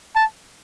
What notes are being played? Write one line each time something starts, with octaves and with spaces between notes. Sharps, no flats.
A5